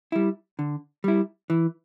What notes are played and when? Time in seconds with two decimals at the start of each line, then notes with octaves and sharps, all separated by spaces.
0.12 G3 E4
0.59 D3
1.04 G3 E4
1.50 E3